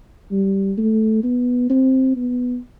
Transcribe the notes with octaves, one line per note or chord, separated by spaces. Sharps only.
G3
A3
B3
C4
B3